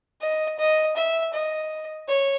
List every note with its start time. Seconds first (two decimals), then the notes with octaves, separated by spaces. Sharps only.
0.21 D#5
0.59 D#5
0.97 E5
1.33 D#5
2.08 C#5